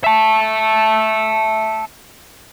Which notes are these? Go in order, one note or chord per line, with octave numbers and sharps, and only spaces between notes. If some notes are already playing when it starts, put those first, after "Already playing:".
E5 A5